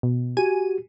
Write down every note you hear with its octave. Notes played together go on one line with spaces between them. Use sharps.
B2
F#4 G4 G#5 D#7